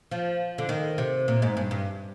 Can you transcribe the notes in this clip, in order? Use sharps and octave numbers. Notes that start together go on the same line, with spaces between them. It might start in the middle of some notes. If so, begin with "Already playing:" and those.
F3
D3
D#3
C3
A#2
G#2
G2
G2